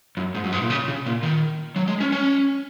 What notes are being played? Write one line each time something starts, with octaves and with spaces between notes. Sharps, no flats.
F#2
G#2
F#2
G#2
A#2
C#3
C#3
A#2
D#3
F#3
G#3
C#4
C#4